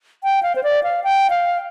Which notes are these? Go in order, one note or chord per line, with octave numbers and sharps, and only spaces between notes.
G5
F5
C5
D5
F5
G5
F5